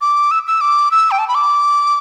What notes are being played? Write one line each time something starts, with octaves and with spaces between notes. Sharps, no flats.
D6
E6
E6
D6
E6
G5
A5
B5
D6